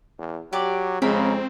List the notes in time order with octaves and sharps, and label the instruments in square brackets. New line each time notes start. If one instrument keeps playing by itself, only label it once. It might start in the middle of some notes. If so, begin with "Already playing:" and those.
[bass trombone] E2
[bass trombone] F#3 [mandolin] G4 D5 D6
[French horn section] F2 G#3 [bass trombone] C#3 [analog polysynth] C4 [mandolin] A#4 B5